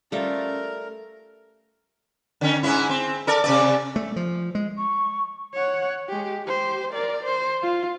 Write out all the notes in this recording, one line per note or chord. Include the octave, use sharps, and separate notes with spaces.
G3 A3 C#4 F4 A4 A#4 C5
D3 C#4
G#2 C#4 E4
C4
A4 A#4 D5
C3 C#4 D5
A3
F3
G#3
C#6
C#5 F#5
G#3 G4
G4 C5
A#4 D5
C5
F4